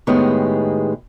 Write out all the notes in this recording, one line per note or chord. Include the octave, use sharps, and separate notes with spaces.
A2 D#3 G#3 B3 G4 G#4